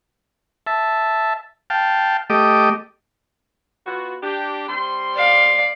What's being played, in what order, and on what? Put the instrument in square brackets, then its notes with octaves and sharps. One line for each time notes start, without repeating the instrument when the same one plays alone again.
[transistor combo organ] E5 A5
F5 G5 A5
A3 G4 D#5 D6
[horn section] B3 F4 F#4
D4 G4
G3 C4 C6
[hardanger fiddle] D5 F5